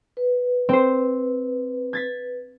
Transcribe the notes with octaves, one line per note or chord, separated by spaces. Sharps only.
B4
C4 C5
G#6 A6 B6